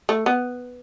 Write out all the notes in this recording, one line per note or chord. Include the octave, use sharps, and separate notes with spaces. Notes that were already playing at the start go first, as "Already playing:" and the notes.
A3
B3